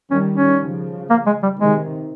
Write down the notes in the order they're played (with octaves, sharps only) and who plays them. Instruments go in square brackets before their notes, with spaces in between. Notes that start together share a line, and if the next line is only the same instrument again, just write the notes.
[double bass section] D#3 G3 [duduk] C#4
[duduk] C#4
[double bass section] C#3 F3
[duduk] A#3
G#3
G3
[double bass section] C3 D#3 [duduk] G#3